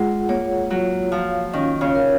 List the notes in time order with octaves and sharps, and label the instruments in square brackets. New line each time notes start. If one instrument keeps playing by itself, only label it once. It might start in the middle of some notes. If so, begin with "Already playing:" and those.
Already playing: [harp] G#3 [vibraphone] F4 G#4 F#5
[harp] A#3 [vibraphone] C#5
[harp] F#3 [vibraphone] F4
[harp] F3 [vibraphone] F5
[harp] D#3 [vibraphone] C#4
[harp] C#3
[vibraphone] A#4